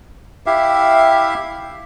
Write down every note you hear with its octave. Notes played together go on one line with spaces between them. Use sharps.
E4 G4 E5 F5